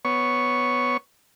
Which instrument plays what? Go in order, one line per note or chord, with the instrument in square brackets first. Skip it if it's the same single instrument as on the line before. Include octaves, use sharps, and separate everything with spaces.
[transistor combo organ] B3 C#5 C#6